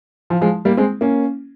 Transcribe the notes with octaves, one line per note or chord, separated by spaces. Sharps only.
F3
F3 G#3
G3 A#3
G#3 C4
A#3 C#4